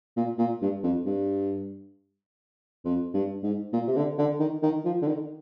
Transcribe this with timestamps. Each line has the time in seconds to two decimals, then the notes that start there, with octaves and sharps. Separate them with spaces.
0.16 A#2
0.38 A#2
0.62 G2
0.83 F2
1.05 G2
2.85 F2
3.14 G2
3.43 G#2
3.73 A#2
3.87 C3
3.96 D3
4.18 D3
4.39 D#3
4.63 D#3
4.85 F3
5.02 D3
5.07 D#3